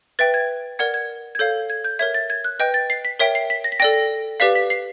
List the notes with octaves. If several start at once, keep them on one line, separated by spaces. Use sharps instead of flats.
B4 E5 G5 A6
G#6
A#4 D5 F#5 G#6
G#6
G#6
A4 C#5 F5 G6
G#6
G6
A#4 C#5 E5 G#6
A6
G#6
F#6
B4 D#5 G5 G6
A6
C7
B6
A#4 C#5 E5 G5 B6
C7
B6
A#6
B6
A4 D5 G5 A#6
G4 B4 D5 F5 B6
B6
C7